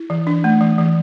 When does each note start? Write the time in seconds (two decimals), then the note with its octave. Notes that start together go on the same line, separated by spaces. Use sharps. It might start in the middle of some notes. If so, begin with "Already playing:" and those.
Already playing: E4
0.10 E3
0.27 D4
0.44 A3
0.61 E3
0.78 E3